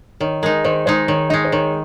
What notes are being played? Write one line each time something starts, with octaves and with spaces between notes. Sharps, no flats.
D#3 C#5
G#3 D#4 A#4
D#3 C5
G#3 D#4 C5
D#3 C#5
G#3 D#4 D#5
C5
D#3 C#5